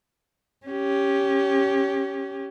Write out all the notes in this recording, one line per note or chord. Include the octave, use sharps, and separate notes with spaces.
C#4 G4